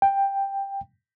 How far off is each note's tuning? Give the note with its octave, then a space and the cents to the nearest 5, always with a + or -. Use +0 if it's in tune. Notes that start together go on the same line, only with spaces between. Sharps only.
G5 +10